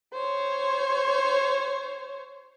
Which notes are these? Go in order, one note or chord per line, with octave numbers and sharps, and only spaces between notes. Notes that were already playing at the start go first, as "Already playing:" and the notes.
C5 C#5